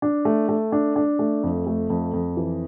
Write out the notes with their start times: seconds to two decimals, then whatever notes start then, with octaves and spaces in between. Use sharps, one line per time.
0.02 D4
0.25 A3
0.49 A3
0.72 D4
0.96 D4
1.19 A3
1.43 F2
1.67 A3
1.90 F2
2.13 F2
2.37 E3